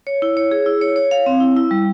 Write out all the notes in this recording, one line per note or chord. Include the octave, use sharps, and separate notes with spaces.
C#5
E4
C#5
G#4
E4
C#5
C#5
F5
C4
E4
E4
G3